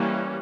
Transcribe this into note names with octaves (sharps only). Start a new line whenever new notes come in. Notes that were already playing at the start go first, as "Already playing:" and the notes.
Already playing: E3 G3 A#3 C#4